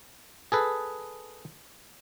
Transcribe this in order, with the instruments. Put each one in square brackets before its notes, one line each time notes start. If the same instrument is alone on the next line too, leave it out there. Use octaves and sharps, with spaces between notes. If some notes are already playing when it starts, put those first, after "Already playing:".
[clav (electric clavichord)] G#4 A4 B4